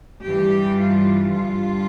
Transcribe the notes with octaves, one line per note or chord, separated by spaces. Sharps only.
G2 E3 G3 G4
F4
G2 D3 G3 F4